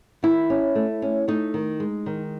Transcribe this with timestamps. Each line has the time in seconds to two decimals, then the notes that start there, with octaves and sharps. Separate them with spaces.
0.23 D#3 E4
0.50 C#4
0.75 A3
1.02 C#4
1.28 A3 D#4
1.54 D#3
1.80 G#3
2.06 D#3